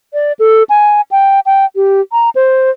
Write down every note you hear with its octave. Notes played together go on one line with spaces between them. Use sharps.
D5
A4
G#5
G5
G5
G4
A#5
C5